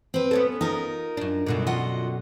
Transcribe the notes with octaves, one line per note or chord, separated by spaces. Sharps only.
C4 B4
B3 C#4 A4
D#4 F4 A#4
F#2 D4
F#2 B2 D3
F4 D#5 F#5